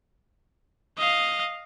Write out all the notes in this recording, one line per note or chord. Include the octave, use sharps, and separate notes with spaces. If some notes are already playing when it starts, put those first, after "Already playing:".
D#5 F5